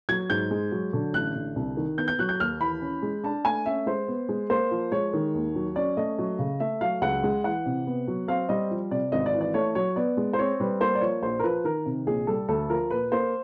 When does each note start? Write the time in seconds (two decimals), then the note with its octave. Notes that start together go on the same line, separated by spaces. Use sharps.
0.09 F#3 G#6
0.29 G#2 G6
0.51 G#3
0.72 F#3
0.93 D3
1.13 A1 F#6
1.35 D3
1.56 C2
1.77 D#3
1.97 B3 G6
2.08 G6
2.19 F#3 F#6
2.29 G6
2.39 D#2 F6
2.60 E3 B5
2.82 C#4
3.02 G#3
3.24 D4 A5
3.45 A3 G#5
3.66 C#4 E5
3.86 G#3 C5
4.08 B3
4.29 G#3
4.50 A#3 C5
4.71 F3
4.92 G#3 C#5
5.13 D#3
5.35 D#2
5.55 F#3
5.76 C#4 D5
5.97 A3 D#5
6.19 F#3
6.39 C#3
6.60 A3 E5
6.81 F#3 F5
7.02 C#2 F#5
7.23 G#3
7.44 E3 F#5
7.66 C3
7.87 B3
8.08 F#3
8.28 C4 F5
8.49 G3 D#5
8.71 F3
8.91 C3 D5
9.12 G#1 D#5
9.26 D5
9.34 E3
9.41 D5
9.54 A3 C#5
9.75 F#3 C#5
9.96 B3 D5
10.17 G#3
10.33 C5
10.39 C4 C#5
10.60 G3 B4
10.80 A#3 C5
10.95 D5
11.01 F3 C#5
11.22 A#1 C5
11.39 A#4
11.43 F3 B4
11.64 D#3 A#4
11.86 C3
12.07 A#1 G#4
12.27 G3 A4
12.48 D2 A4
12.69 F3 A#4
12.91 A#2 B4
13.12 A#3 C5